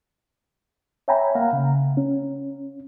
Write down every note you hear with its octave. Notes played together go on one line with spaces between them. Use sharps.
C#5 E5 G5 G#5 A#5 B5
A#3 F5 F#5 A#5
C#3
C#4